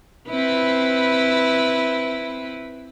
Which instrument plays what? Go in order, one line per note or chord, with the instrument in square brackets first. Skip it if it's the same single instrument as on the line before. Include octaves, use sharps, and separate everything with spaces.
[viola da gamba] C4 E4 B4